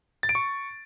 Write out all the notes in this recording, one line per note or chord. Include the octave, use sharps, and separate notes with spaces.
A6
D7
C#6